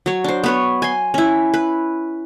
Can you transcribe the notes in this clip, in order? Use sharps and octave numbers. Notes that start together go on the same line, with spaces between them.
F#3 C#5
D4 C5
B3 B4 C#5
G#5 C6
C#4 E4
B4